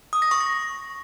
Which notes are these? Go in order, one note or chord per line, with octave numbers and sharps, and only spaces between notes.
D#6
A#6
C#6
A#6